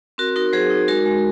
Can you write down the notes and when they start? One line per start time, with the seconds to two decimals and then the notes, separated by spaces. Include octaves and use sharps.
0.18 C4 F#4 A#4
0.36 D#4 F#4 A#4
0.53 F#3 G#4 C5
0.70 D#4
0.88 G#3 F#4 A#4
1.06 G#3